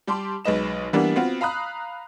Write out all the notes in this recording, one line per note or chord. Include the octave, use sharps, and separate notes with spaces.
G3 G4 A5 C6 D6
B1 G#3 B4 D#5 E7
E3 G3 A#3 B3 D4
B3 C4 F4 F#4
F5 A#5 B5 D#6 F#6